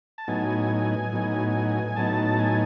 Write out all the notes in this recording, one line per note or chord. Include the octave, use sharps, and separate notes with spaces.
A5
A2 F#3 B3 D#4 G#5
A2 F#3 B3 D#4
A2 F#3 B3 D#4 A5
G#5